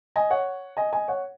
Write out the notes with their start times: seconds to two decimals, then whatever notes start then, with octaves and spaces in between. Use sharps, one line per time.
0.16 D#5 G#5
0.30 C#5 F#5
0.77 D#5 G#5
0.93 D#5 G#5
1.08 C#5 F#5